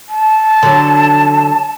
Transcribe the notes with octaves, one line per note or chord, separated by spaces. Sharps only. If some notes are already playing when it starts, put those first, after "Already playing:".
A5
D3 F#3